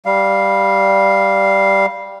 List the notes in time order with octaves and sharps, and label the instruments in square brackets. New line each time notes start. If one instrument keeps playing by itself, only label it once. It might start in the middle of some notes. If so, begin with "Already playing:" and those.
[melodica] G3 F5